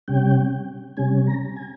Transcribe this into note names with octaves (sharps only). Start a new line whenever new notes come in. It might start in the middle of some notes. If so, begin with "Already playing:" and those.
C3 G3 C#4 G5
C3 G3 C#4 G#5
A#5
G#5